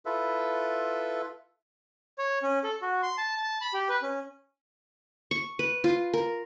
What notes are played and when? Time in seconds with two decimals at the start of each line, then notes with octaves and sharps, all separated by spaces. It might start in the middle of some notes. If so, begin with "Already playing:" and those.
0.06 E4 F4 A4 B4 E5
2.18 C#5
2.43 C#4
2.64 A4
2.82 F#4
3.03 C6
3.18 A5
3.37 A5
3.61 B5
3.74 G4
3.89 B4
4.02 C#4
5.31 C#6
5.59 B4
5.84 F4
6.14 A#4